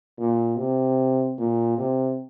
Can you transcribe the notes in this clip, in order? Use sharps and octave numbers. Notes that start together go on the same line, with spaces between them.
A#2
C3
A#2
C3